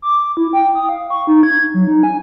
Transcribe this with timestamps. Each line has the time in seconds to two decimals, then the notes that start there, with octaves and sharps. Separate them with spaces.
0.02 D6
0.37 E4
0.53 G5
0.75 D#6
0.89 F5
1.10 C#6
1.27 D#4
1.43 G#6
1.74 F#3
1.87 D#4
2.03 G#5